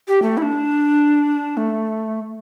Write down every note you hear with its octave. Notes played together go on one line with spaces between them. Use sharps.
G4
A3
E4
D4
A3